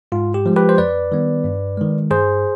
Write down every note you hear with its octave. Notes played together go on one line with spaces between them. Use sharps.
G#2 F4
G4
F3 G#3
G4 B4
C5
F2 B4 D5
D#3 G3 B3
G2
D#3 G#3
G2 G#4 C5